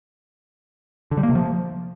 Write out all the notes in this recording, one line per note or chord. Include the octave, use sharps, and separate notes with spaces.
D3
G3
A#3
C3
F3